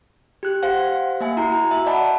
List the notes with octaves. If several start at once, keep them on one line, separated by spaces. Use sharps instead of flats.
G4 F#6
G4 C5 F5 F#5
A#3 E5 G#5
E4 F#4 A#5
E5
D5 D#5 F#5 A5 B5